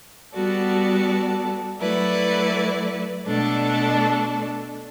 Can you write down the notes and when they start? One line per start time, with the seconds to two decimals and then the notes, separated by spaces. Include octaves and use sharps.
0.34 G3 B3 F#4 A4 D5
1.80 F#3 A3 E4 B4 D5
3.26 B2 A3 D4 A4 D5